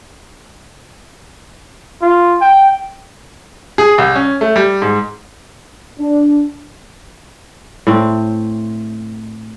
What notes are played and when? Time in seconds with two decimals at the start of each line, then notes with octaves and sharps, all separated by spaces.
2.02 F4
2.41 G5
3.78 G#4
3.98 C2
4.15 C#4
4.41 A3
4.56 G3
4.82 G#2
5.98 D4
7.87 A2 C4